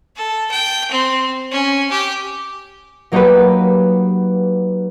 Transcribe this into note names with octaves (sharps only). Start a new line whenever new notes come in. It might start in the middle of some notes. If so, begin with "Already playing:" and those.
A4
G5
C4
C#4
G4
F#3 A#3 D#4 F#4 G4 B4